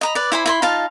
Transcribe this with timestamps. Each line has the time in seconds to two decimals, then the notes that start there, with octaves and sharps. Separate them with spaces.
0.01 D#5 A#5 B5
0.15 B4 D5
0.32 E4 C5 G#5 B5
0.46 E4 B5 C6
0.62 D#4 F4 F5 A5